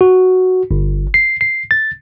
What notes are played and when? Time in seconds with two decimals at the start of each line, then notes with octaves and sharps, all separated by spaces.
0.01 F#4
0.71 G1
1.14 C7
1.41 C7
1.71 A6